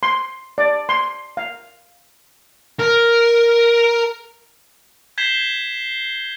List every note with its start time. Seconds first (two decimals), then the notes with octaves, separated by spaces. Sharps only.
0.03 C6
0.58 D5
0.89 C6
1.37 F5
2.80 A#4
5.18 G6 G#6 B6 C7 E7 G7